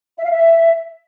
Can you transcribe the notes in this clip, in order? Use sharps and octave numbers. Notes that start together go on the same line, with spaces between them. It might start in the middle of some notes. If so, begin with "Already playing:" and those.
E5
F5
E5